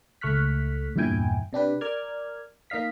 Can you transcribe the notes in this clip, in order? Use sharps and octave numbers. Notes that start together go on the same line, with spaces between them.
C#2 A3 C#6 F6 F#6 B6
E2 G2 A#2 E4 G5 G#5
C3 D4 G4 B4
A#4 D5 F6 G#6
A#3 D#4 D#5 F5 B6